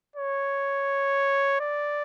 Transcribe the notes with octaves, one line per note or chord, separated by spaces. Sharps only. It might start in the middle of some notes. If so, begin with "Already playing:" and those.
C#5
D5